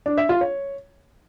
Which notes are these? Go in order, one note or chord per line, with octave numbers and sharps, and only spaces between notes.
D4
E5
F4
C#5